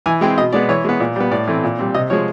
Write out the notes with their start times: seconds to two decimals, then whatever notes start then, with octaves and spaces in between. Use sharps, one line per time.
0.06 E3 G#5
0.21 G#3 C4 G5
0.38 B2 D#5
0.53 G#3 B3 D5
0.69 E3 C#5
0.85 G#3 B3
1.00 A#2
1.16 G3 B3
1.31 A2 D5
1.48 E3 A3 C4
1.64 A#2
1.79 G3 C4
1.94 C3 D#5
2.10 F3 G#3 C#5